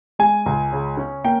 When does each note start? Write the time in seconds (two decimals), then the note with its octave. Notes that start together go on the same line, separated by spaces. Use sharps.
0.19 G#3 G#5
0.46 C#2
0.72 C#3
0.97 C#4
1.24 A#3 G5